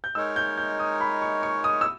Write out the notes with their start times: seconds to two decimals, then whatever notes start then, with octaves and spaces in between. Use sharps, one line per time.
0.04 G6
0.15 G#3 D#4 A#4 C#5 E6
0.36 G6
0.58 G6
0.79 D#6
1.01 B5
1.22 C#6
1.43 C#6
1.64 D#6
1.81 E6